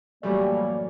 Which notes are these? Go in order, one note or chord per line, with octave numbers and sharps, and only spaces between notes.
F#2 A2 E3 G3 A3 A#3 D5